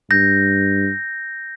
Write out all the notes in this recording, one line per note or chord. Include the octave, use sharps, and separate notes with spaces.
G2 G6 A#6